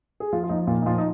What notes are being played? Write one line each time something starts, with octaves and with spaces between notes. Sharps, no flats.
G#4
F3 F4
F4
F3 D#4
A#2 F4
D#4
F3 F4
D#4